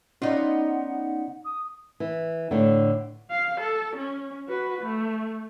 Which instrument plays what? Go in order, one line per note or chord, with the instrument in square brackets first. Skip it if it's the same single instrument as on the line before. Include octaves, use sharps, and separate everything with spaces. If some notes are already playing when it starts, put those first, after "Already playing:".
[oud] B3 D#4 F4 [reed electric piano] C#4 D5 [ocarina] F#5
[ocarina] D#6
[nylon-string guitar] E3
A2 D3
[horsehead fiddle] F5
A4
C#4
F#4 B4
A3